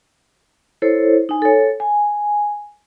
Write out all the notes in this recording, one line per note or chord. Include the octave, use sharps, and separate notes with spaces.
E4 A4 C5 C#5
D#4 G#5
A4 C#5
G#5